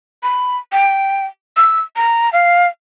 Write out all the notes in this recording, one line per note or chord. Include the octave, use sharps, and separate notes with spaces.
B5
G5
E6
A#5
F5